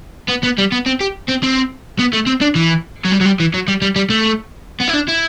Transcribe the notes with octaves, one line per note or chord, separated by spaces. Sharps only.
B3
B3
G3
B3
C4
G4
C4
C4
B3
A3
C4
D4
E3
F#3
G3
F#3
G3
E3
F#3
G3
G3
G3
A3
B3
E4
D4
E4